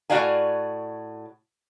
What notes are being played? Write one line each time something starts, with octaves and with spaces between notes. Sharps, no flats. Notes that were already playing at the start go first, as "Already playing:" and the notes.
A2 F#4 D5 F5 G#5